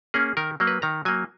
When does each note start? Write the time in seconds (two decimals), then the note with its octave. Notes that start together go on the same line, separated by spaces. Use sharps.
0.14 A#3 C#4 G#4
0.37 D#3 A#4
0.60 F#3 A#3
0.67 B4
0.82 D#3 A#5
1.05 F#3 A#3 G#5